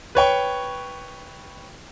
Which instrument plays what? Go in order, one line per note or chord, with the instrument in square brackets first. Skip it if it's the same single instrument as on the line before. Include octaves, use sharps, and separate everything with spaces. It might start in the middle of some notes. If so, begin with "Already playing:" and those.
[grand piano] B4 C#5 G5 C#6